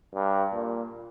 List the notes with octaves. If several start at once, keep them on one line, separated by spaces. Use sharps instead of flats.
G2
A#2